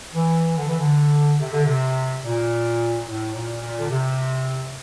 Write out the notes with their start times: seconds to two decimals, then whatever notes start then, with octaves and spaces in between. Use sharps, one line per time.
0.15 E3
0.58 D3
0.69 E3
0.80 D3
1.41 C3
1.53 D3
1.66 C3
2.24 A#2
3.08 A2
3.35 A#2
3.62 A#2
3.79 D3
3.90 C3